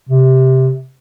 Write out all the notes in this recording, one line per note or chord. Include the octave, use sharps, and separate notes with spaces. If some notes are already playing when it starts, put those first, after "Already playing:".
C3